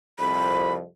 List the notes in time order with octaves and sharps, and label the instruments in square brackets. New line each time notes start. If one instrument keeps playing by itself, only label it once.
[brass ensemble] C2 F2 [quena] B5